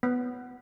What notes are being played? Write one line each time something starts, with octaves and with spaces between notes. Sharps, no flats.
B3